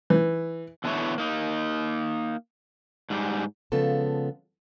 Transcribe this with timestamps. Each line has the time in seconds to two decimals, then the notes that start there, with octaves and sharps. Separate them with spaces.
0.10 E3
0.84 E2 D3 B3 D#4 E4 C#5
1.18 A#3 D#4
3.10 G#2 G3
3.72 C#3 F3 G#3 B3 A4 A5